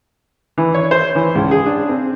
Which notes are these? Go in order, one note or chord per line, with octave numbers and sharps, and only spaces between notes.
E3
C#5
C5
E3
C#2
G#4
D4
C4